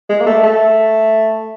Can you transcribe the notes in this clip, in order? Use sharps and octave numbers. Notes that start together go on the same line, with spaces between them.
G#3
A#3
A3
A3